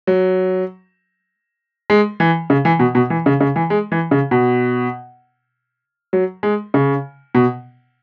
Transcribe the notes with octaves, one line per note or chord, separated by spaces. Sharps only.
F#3
G#3
E3
C#3
E3
B2
B2
E3
C#3
C#3
E3
G#3
E3
C#3
B2
F#3
G#3
C#3
B2